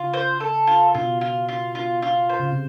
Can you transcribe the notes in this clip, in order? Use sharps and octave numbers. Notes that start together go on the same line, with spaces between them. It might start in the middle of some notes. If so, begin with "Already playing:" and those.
Already playing: C#3 F4
C5
A4
F4
B2 F4
F4
F4
F4
F4
C5
C#3
C3